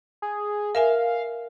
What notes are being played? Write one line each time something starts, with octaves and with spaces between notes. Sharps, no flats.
G#4
A#4 E5 F5 G#5